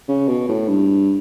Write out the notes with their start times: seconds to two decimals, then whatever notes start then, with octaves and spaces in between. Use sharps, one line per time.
0.08 C#3
0.28 B2
0.48 A2
0.69 G2